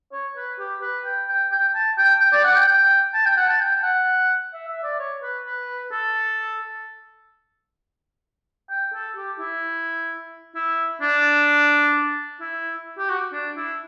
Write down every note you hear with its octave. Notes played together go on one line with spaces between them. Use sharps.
C#5
B4
G4
B4
G5
G5
G5
A5
G5
G5
D5
F#5
G5
G5
A5
G5
F#5
A5
G5
F#5
E5
E5
D5
C#5
B4
B4
A4
G5
A4
G4
E4
E4
D4
E4
G4
F#4
D4
E4